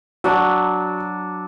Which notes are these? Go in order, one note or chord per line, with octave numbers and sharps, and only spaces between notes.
F#3 D4 F#4